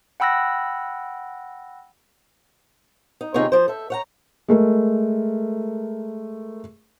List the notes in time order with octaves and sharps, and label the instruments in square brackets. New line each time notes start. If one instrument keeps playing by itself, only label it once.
[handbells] F#5 G5 B5 E6 F#6 A#6
[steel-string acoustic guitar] D#4
D#2 C3 D#4 F4 G#4 C#5
F3 C5
A4 E5
C#5 F#5 A#5
[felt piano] G#3 A3 A#4